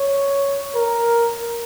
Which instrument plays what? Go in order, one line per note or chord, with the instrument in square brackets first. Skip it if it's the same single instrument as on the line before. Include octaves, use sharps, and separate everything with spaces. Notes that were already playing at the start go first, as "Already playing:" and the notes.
Already playing: [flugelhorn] C#5
A#4